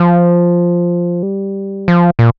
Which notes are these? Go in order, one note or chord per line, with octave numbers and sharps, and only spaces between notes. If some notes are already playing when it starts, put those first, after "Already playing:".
Already playing: F3
G3
F3
A#2